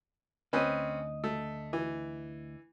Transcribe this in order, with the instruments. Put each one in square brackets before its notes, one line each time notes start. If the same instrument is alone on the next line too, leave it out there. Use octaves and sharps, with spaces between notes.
[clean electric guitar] D2 D#5 [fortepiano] C4 C#4 B4
[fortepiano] A3
E3